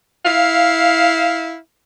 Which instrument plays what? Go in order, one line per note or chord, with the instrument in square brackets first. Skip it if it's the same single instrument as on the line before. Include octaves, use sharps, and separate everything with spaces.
[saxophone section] E4 F5